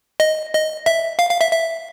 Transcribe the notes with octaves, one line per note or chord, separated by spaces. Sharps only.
D#5
D#5
E5
F5
F5
E5
E5